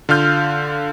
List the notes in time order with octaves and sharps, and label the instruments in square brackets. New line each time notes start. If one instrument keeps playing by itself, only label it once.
[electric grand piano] D3 F4 F5 F6 G6